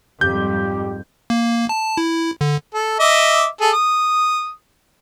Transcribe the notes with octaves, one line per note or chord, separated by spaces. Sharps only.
F2 G#2 G3 G4 G6
A#3
A5
E4
D3
A4
D#5 E5 D6
G#4 A4
D#6